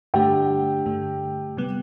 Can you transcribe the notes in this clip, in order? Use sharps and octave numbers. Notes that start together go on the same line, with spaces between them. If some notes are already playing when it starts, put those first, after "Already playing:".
G2 D3 A3 D4 G4 G5
G2 D3 A3
C3 G3 B3